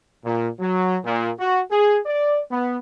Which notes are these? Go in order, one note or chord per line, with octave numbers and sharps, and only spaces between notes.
A#2
F#3
A#2
F#4
G#4
D5
B3